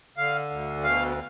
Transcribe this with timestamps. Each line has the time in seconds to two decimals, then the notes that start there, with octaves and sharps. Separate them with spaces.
0.17 D3 F5
0.51 D2
0.84 B2 F5